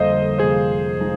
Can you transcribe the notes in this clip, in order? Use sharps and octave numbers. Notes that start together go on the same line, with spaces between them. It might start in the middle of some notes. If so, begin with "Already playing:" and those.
Already playing: F2 D3 G3 A#3 C5 D#5
C3 F3 A#3 G#4 C5
F3 G#3 D#4